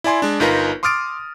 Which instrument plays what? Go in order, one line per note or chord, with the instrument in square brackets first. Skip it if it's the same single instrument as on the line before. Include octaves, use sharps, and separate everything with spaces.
[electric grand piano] E4 D5 G#5 C6
G#3 D4
G1 D#4 F4 A#4 B4 A#6
C6 D6 D#6 F6 A6 D7